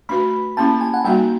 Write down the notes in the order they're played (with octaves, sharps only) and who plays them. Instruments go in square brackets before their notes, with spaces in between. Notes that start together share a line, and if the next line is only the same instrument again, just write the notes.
[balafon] A3 D4 F#4 B4 [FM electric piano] B5
[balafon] A#3 C#4 E4 G4 [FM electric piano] A5
[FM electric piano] G#5
F#5
[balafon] G3 A#3 D#4 F#4 [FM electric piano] G5